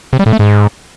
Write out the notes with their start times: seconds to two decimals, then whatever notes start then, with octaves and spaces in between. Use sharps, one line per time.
0.13 C3
0.19 G3
0.26 A2
0.33 A3
0.39 G#2